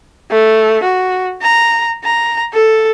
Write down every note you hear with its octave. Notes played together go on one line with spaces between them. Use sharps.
A3
F#4
A#5
A#5
A4